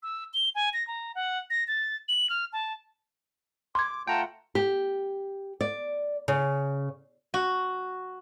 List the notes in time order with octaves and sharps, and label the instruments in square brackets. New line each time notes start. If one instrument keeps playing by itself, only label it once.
[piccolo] E6
G7
G#5
A#6
A#5
F#5
A#6
A6
F#7
F6
A5
[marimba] C6 G#6 [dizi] D6
[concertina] A3 F4 F#5 [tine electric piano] G5 A#5 [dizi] A5
[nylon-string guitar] G4
D5
C#3
[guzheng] F#4